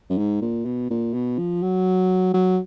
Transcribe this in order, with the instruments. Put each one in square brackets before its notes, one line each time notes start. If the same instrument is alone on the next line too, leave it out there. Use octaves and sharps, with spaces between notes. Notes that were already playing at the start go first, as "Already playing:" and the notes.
[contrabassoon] F#2
G#2
A#2
B2
A#2
B2
F3
F#3
F#3